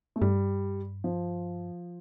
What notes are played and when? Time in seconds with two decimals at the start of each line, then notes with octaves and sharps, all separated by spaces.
0.16 A3
0.21 G2 G3
1.04 F3